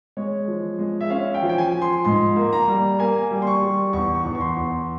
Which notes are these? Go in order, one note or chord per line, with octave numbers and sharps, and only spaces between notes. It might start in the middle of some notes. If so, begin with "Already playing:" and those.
G#3 C#5
F3
G#3
E5
C#4 F5
G5
F3
G5
G#5
F3
C6
G#2 C6
A#3
A#5
G3
A#3 G#5
G3
C6
C#6
G3
E2 C#6
C#6
E2
C#6
C6
E2